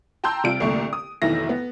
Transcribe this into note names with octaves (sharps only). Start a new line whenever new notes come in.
G5 A5 A#5 C6 E6 G6
C3 G3 F4 D7
C2 A#2 D3 A3 C#6
D#6
F1 B1 D#3 E3 E4 A#6
B3